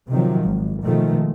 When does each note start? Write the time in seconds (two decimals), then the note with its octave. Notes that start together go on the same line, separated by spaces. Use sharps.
0.10 C3 D#3 F3 F#3
0.45 G#1
0.84 B2 D#3 F3 G#3 A3